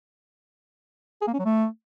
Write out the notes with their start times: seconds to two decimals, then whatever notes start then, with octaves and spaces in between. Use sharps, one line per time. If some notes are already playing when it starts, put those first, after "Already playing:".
1.22 G#4
1.27 A#3
1.33 C#4
1.39 F#3
1.45 A3